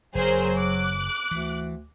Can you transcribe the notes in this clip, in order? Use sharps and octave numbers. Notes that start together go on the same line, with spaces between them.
F#1 F#3 G#4 A#4 C5
D6 F#6
D2 E3